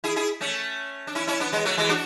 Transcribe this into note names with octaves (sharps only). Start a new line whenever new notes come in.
E4 G#4
E4 G#4
A3 C#4
D4
C#4 E4
C#4 E4
B3 D4
G#3 B3
F#3 A3
E3 G#3
D4 F#4